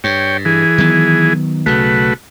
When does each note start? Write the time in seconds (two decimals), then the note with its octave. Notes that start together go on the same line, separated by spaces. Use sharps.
0.04 G2 C#5 G5
0.45 E3 G#4
0.78 D#3 F#3 B3
1.66 B1 C#3 A3 F#4 B4